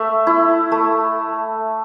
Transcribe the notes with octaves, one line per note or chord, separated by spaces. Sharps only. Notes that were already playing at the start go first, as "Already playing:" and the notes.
Already playing: A3 E5
E4
A3